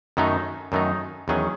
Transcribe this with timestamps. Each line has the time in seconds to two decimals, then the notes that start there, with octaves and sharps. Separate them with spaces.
0.17 F#2 D#3 F#3 A3 D#4
0.72 F#2 D#3 F#3 A3 D#4
1.28 E2 D#3 F#3 C#4 G#4